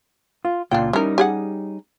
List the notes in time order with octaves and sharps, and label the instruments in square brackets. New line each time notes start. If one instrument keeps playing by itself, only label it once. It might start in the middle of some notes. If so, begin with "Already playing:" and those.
[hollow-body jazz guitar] F4
[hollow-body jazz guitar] C#2 A#2 F4 [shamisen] D4 G5
[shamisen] E3 A#4 [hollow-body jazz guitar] G3 C#4 D#4
[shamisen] G4 G#4 F#5